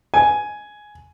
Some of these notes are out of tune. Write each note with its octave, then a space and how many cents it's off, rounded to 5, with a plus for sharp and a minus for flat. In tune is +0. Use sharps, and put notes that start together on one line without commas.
G#5 +10